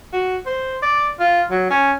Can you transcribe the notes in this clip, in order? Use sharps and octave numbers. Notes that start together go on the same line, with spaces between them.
F#4
C5
D5
F4
F#3
C#4